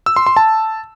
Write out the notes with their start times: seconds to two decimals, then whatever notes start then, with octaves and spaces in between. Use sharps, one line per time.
0.06 E6
0.16 C6
0.26 C6
0.37 A5